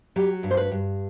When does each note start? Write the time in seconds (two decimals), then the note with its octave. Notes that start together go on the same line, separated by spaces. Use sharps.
0.16 F#3 G4
0.43 G2
0.51 C5
0.57 B4
0.71 G2